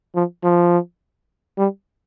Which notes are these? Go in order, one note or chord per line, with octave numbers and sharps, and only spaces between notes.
F3
F3
G3